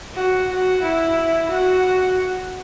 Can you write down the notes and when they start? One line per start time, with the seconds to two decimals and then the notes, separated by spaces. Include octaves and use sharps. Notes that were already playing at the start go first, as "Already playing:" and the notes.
0.14 F#4
0.48 F#4
0.82 E4
1.49 F#4